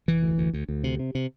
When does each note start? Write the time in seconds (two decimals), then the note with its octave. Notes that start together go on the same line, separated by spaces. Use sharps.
0.08 F1 E3
0.23 D2
0.38 D2
0.54 D2
0.69 D2
0.84 C3
0.99 C3
1.15 C3